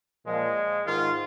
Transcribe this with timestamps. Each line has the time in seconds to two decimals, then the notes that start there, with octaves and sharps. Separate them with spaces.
0.25 A#2 F3 G#3
0.86 G#2 D#3 F4